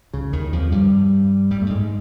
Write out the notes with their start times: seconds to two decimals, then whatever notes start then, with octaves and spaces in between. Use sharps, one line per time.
0.13 C#2 C#3
0.33 D#2 D#3
0.53 F2 F3
0.72 G2 G3
1.51 G2 G3
1.62 A3
1.70 G#2 G#3